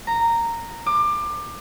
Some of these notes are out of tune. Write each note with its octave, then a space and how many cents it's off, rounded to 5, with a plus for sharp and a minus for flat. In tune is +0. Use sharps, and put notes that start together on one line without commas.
A#5 -10
D6 +25